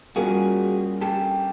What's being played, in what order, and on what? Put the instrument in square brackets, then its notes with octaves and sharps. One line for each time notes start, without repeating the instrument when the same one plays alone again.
[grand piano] G3 A#3 C#4 F4 A#4 [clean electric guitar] F#4 G#4
[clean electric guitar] G4 A4